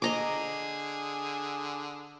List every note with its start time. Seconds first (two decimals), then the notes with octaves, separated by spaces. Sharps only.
0.02 D3 G#4 D#5 A#5 D6